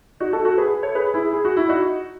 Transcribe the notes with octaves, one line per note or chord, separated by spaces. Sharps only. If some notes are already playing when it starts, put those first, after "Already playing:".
D#4 F#4
F#4 A4
F#4 A4
G#4 B4
A4 C#5
G#4 B4
E4 G#4
G#4
F#4
E4
D#4 F#4